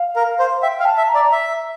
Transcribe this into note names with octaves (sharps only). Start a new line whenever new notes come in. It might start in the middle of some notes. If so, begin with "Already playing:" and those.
Already playing: F5
A#4
C5
E5 G5
F5
A5
E5
A#5
D5
E5